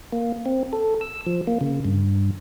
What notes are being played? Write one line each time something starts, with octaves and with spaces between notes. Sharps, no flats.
A#3
C4
A4
E6
F3
A#3
C#3
G2